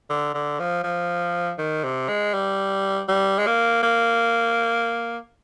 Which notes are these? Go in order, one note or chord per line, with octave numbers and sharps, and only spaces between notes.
D3
D3
F3
F3
D#3
C3
G#3
G3
G3
G#3
A#3
A#3